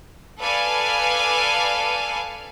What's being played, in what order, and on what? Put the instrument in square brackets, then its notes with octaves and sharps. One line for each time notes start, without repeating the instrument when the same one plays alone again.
[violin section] A4 B4 D5 F5 G#5